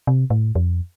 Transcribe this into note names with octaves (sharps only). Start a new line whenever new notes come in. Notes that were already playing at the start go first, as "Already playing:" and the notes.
C3
A2
F2